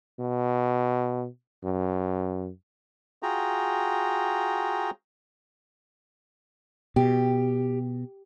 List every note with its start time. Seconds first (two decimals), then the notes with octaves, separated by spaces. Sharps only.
0.20 B2
1.64 F#2
3.23 F4 F#4 G#4 G5 A#5
6.96 B2 G4